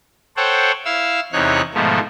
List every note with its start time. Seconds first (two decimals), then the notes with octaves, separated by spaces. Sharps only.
0.37 A4 C5 C#5 F#5 G5
0.85 E4 F5 E6
1.33 E2 C3 D#4 C#5 F#6
1.74 G#2 B2 D#3 F3 A3